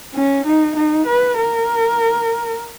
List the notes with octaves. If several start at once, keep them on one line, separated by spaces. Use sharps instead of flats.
C#4
D#4
D#4
B4
A#4